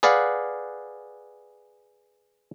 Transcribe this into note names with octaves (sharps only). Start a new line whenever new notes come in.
G#4 B4 D5 F5 F#5